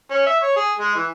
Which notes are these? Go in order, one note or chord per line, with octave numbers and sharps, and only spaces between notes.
C#4
E5
C#5
G#4
G#3
E3